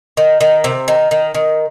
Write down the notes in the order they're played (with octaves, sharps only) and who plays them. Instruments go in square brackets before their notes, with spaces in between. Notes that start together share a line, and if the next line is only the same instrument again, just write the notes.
[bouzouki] D#3
D#3
C3
D#3
D#3
D#3